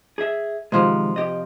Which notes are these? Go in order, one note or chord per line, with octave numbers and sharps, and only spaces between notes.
G#4 E5
C3 D#3 F3 F#3 G#3
G4 D#5